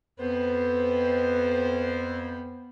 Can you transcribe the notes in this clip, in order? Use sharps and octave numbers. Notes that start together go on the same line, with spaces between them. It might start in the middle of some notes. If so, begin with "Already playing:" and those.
F2 B3 B4 C5